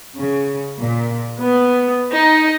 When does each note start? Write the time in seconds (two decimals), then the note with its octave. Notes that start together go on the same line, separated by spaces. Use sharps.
0.17 C#3
0.81 A#2
1.39 B3
2.11 D#4